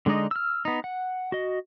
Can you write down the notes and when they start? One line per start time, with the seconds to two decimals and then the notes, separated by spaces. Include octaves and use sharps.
0.06 D3 G#3 D4 D#4 D#5
0.31 E6 F6
0.65 B3 D#4
0.84 F#5
1.32 F#4 D#5